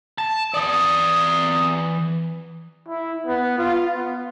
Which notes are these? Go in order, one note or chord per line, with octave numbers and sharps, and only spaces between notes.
A5
E3 D5 D#6
E4
B3
F4
B3